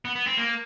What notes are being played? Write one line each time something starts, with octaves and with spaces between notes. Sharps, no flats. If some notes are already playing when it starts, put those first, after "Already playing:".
B3
B3
C4
A#3